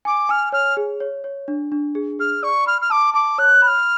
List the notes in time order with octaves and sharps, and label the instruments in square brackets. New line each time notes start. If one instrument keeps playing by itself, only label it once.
[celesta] G#5 [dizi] D6
[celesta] G#5 [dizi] F6
[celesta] C#5 [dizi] F6
[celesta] G#4
C#5
C#5
D4
D4
G#4
[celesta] G#4 [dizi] F6
[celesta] D5 [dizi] C#6
[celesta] B5 [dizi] F6
[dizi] F6
[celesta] A5 [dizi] D6
[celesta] A5 [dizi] D6
[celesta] C#5 [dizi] F#6
[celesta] B5 [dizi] F#6
[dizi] F6